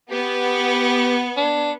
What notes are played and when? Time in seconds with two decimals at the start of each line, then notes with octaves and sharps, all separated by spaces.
0.11 B3 G4
1.37 D4